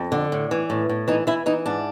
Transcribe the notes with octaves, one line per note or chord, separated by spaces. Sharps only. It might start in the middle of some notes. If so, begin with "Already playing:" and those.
Already playing: F2
D3
A2
E3
A2
A2
E3 D#4
E3 E4
E3 D#4
G#2 D4